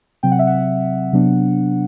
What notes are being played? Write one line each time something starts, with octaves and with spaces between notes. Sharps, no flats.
C3 F#3 C4 G5
F#5
E5
F#5
C3 F#3 B3 D4